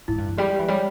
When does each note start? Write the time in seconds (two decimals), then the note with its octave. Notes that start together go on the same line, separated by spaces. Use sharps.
0.08 G#2 E4
0.18 G2
0.28 E3
0.38 G3 G4
0.54 G4
0.59 E3
0.68 G3 C#5